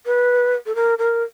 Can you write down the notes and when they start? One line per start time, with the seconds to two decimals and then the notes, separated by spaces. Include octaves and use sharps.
0.06 B4
0.66 A4
0.75 A#4
0.99 A#4